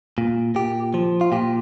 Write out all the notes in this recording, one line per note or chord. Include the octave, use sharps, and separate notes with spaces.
A#2
A#2 G4
F3
F4
A#2 G4